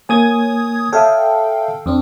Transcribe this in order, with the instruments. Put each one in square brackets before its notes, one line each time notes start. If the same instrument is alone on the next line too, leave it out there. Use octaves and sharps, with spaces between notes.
[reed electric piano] A#3 G#5 [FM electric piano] C#5 D#6 G#6
[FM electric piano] A4 F5 G5 [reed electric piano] C#5 E5 D#6
[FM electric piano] F2 C4 D4